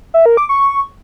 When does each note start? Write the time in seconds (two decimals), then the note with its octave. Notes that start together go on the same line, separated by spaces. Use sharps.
0.14 E5
0.26 A#4
0.37 D6
0.49 C#6